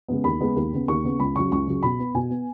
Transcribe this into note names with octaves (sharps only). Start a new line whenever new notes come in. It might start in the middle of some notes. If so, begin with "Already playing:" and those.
C#3 G#3 B3
D#2 B5
C#3 G#3 B3
D#2
C#3 B3
D#2 C#6
C#3 B3
C#2 B5
C#3 F#3 C#6
C#2 C#6
C#3 F#3
B2 B5
B3
B2 G#5
B3